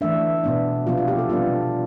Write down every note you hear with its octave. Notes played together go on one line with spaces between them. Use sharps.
E3 A3 D4 E5
B2 B3 D4
C3 F3 B3 D4 F4
F4
G4
A4
B2 G3 B3 D4 F4